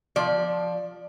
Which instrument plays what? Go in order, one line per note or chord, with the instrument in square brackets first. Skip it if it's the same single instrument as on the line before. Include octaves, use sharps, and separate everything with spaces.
[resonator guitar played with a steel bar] F3 D5